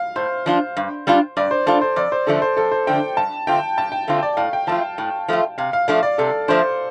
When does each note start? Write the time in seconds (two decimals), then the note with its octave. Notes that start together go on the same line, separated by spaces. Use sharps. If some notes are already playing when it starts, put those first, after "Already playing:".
Already playing: F5
0.16 A2 C5
0.46 F3 D4 F4
0.77 G2
1.07 G3 D4 F4
1.37 G2 D5
1.51 C5
1.66 G3 D4 F4 A4
1.81 C5
1.96 F2 D5
2.12 C5
2.27 D3 F3 A3 D4 A4
2.42 C5
2.57 F2 A4
2.72 C5
2.87 D3 F3 A3 D4 G5
3.17 G2 A5
3.47 D3 A3 C4 F4 G5
3.78 G2 A5
3.92 G5
4.08 D3 A3 C4 F4
4.23 D5
4.37 A2 F5
4.53 G5
4.67 F3 A3 F4 A5
4.98 A2
5.28 F3 A3 F4
5.58 C3 F5
5.73 F5
5.88 F3 A3 D4 F5
6.03 D5
6.18 C3 A4
6.48 F3 A3 D4 C5